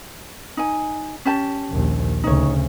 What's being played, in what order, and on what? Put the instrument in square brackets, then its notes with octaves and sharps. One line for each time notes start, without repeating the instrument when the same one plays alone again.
[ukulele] D#4 G#5
C#4 G4 A5
[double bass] A#1 D#2
[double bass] D2 C#3 [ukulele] D#4 C#5